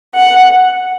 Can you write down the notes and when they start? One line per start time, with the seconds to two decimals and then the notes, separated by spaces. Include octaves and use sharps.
0.15 F#5